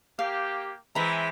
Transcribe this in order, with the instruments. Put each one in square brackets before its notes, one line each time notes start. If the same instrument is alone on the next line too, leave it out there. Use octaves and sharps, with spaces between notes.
[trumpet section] A#3 G4 [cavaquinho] F5
[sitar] E3 G#3 [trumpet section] C4 E5 [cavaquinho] A#5 B5